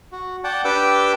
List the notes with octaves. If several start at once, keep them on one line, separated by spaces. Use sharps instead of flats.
F#4
D5 F#5 G5 A5
D4 G4 B4 G5 D6 E6